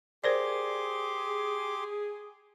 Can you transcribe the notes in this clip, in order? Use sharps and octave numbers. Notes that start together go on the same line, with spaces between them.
G4 G#4 A#4 C5 D5 C6 D6